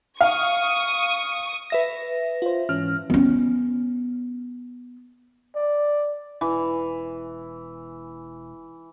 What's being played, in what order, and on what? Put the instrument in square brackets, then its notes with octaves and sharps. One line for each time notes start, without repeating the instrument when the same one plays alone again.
[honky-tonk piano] F5 [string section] C#6 D#6
[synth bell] B4 E5 A#6
[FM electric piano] F4 C5
[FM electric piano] G#2 E3 C#4 [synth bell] F6
[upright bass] B3 C#4
[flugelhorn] D5
[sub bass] E1 [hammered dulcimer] E3